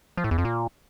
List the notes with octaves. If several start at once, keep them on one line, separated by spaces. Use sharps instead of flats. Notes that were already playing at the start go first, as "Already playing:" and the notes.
F3
A2
E2
F2
A#2